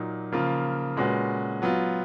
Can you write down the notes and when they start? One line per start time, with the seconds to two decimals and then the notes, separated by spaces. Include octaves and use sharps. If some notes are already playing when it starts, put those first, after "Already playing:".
Already playing: A#2 F#3 A#3 D#4
0.32 C#3 F3 A#3 F4
0.97 A#2 G#3 C#4 F#4 B4
1.62 F#3 B3 F4